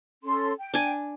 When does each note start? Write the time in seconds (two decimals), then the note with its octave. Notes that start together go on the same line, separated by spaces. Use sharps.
0.23 C#4 A4 C6
0.58 G5
0.74 D4 G#5